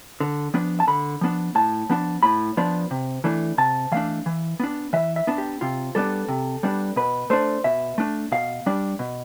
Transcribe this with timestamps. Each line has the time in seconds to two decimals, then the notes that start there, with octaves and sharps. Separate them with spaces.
0.20 D3
0.54 F3 B3 D4
0.80 A5
0.88 D3 B5
1.21 F3 B3 D4
1.55 A2 A5
1.90 F3 B3 D4
2.23 A2 B5
2.57 F3 B3 D4
2.91 C3
3.24 E3 A3 D4
3.58 C3 A5
3.92 E3 A3 D4 F5
4.26 E3
4.60 B3 D4
4.93 E3 E5
5.16 E5
5.27 B3 D4
5.38 G4
5.61 C3 F4
5.95 G3 B3 D4 A4
6.28 C3
6.63 G3 B3 D4
6.96 B2 B4
7.30 A3 D4 C5
7.64 B2 E5
7.98 A3 D4
8.32 B2 F5
8.66 G3 D4
8.99 B2